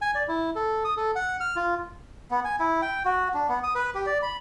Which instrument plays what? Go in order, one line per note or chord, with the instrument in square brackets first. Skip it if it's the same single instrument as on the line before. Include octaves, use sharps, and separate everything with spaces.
[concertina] G#5
D5
E4
A4
D#6
A4
F#5
F6
F4
[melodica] B3
G#5
E4
G5
F#4
D4
B3
D#6
B4
G4
D5
B5